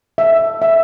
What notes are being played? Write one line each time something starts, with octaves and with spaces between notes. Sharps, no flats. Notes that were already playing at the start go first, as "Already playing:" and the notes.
E5
E5